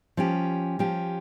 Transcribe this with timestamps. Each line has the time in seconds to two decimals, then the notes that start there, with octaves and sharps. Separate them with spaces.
0.17 F3 C#4 G4
0.79 F3 C#4 G4